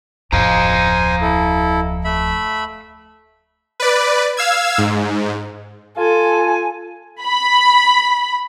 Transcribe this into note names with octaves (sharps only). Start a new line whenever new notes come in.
D1 F2 C5 D#5 F5 G#5 A#5
E4 A4
A3 E5 B5
B4 D5
F5 E6 G#6
G#2
F4 A4 G#5
B5